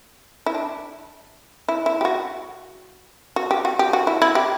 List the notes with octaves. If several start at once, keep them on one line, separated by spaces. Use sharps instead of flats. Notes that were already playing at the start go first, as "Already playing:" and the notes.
E4
D4
E4
E4
G4
F#4
F#4
G4
F#4
G4
F#4
E4
E4
G4